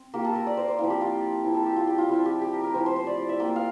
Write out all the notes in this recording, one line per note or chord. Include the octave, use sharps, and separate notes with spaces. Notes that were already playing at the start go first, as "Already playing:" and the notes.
Already playing: C4
A#3 F4 G4
A4
A#4
D5
C5
C5
F3 C4 E4 F5
G4
F4
F3 C4 E4
A4
G4
F4
G4
F4
F3 C4 E4 G4
G4
G4
A#4
A#4
F3 A3 E4 C5
C5
C5
D5
D5
E5
A#3 F4 G5
F5